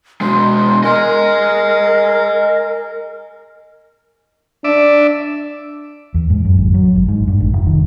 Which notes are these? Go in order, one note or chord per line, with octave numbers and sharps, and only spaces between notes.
B2 G#3 C6
A#4 D#5 G#5
D4 D5 E5
E2
G#2
F#2
G#1
F#3
G#1
G#2
G2
G#1
F1
D#3